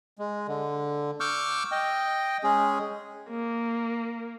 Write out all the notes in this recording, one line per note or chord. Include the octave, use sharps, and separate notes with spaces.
G#3
D3
C#6 D6 E6 F6 G6
D#5 G5
G#3 C#4 G#4
A#3